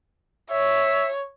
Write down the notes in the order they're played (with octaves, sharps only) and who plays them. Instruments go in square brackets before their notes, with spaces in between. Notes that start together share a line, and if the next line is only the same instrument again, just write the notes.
[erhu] C#5 [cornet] E5